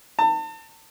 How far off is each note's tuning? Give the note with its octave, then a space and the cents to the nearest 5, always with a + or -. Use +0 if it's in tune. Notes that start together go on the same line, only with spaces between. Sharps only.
A5 +35